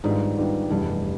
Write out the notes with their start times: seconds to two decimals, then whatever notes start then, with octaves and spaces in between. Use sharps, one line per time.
0.04 G#2 D#3 G3 B3 D4 F4
0.37 D#3 G3 B3 D4 F4
0.70 F1 E2 G2 C3